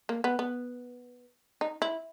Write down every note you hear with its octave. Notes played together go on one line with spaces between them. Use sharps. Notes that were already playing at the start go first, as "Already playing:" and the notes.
A#3
B3
B3
D#4
E4